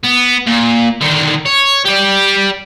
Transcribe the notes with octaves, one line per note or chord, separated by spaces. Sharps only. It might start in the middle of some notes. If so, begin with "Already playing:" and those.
B3
A#2
D3 D#3
C#5
G4 D5